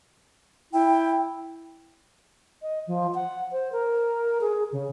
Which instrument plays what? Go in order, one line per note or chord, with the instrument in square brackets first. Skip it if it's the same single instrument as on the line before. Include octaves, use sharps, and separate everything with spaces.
[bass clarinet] E4 [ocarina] G5
[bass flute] D#5
F3
F#5
C5
A#4
G#4
C#3